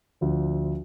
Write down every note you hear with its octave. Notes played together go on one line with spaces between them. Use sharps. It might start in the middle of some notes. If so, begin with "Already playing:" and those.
D2 D3 F3